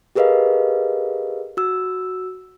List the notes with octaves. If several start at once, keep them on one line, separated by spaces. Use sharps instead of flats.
G4 G#4 A#4 B4 D#5 F5
F#4 E6